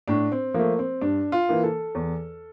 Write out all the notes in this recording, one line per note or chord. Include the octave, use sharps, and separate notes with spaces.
A2 D4
C4
F3 A3 A#3
C4
G2 D4
F4
E3 A#3
A4
E2